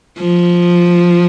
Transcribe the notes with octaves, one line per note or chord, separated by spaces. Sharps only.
F3